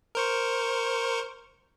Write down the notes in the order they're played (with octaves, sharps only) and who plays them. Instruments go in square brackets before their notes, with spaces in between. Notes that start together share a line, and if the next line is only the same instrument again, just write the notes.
[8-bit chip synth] A#4 C5 C#6